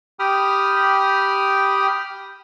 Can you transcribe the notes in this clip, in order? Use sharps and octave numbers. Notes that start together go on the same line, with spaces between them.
G4 G5 B5 D#6 F6